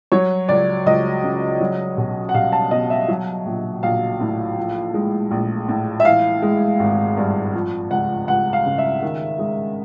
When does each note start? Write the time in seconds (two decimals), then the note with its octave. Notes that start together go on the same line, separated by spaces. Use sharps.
0.12 F#3 C#5
0.49 C#2 D5
0.86 C#2 D#5
1.24 C#3
1.60 F#3
1.97 B1
2.29 F#5
2.34 B1 F5
2.52 A5
2.71 B2 D#5
2.90 E5
3.08 F#3
3.46 A#1
3.83 A#1 F5
4.20 A2
4.57 F3
4.94 G#3
5.31 A#1
5.68 A2
6.00 E5
6.05 E3 F5
6.42 G#3
6.80 G#1
7.17 G2
7.54 F3
7.91 C#2 F#5
8.28 C#2 F#5
8.53 F5
8.66 C#3
8.78 E5
9.02 D#3
9.39 G#3